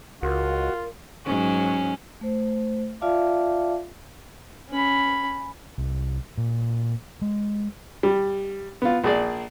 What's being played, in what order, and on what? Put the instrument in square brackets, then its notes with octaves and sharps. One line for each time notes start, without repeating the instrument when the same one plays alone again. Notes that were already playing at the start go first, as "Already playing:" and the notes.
[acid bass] C#2 [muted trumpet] F4 [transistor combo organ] F#4 [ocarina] A#4
[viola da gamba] G#2 F#3 [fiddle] C#4
[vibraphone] A3 C5
F4 D5 E5 F5 A5 D6
[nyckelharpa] C#4 B5
[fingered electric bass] C2
A#2
G#3
[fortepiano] G3
B3 F4
A#1 G#4 D5